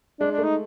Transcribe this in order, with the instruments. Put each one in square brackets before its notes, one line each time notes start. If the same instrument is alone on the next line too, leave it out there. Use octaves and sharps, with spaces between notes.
[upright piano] G#3 [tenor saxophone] D4
[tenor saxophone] D4
[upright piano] A3
[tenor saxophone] D#4